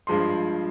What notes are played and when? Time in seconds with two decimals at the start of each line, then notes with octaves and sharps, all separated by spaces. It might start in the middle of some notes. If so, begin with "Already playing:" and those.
0.07 G2 F3 G#3 C6